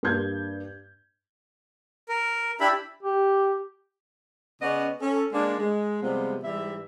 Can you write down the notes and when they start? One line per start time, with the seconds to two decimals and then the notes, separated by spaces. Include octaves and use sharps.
0.03 G2 A#3 D4 G6 G#6
2.09 A#4
2.60 D4 E4 G4 E5 B5
3.03 G4
4.61 C#3 B3 C#4 D5 D#5
5.00 C#4 A4
5.33 G#3 A#3 D4
5.58 G#3
6.01 C3 F3 G3 G#3 B3
6.43 G#2 E3 G3 E5